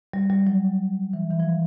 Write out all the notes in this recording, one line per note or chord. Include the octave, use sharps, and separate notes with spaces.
G3
G3
F#3
E3
E3
F3